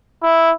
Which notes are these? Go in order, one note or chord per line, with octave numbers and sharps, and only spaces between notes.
E4